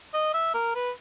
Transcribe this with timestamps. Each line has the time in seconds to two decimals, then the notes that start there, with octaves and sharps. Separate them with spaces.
0.14 D#5
0.34 E5
0.54 A#4
0.75 B4